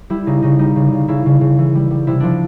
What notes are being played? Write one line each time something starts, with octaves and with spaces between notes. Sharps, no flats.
G3 E4
C#3 D#4
C#3 D#4
G3 D#4
C#3
C#3
C#3 E4
C#3
C#3
E3
G3
G3
C3 E4
F3 D4